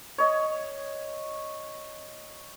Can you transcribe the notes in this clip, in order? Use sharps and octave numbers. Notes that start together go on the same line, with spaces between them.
C#5 D#5